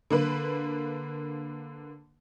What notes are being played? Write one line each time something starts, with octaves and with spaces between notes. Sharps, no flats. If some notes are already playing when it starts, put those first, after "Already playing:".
D3 A#3 B4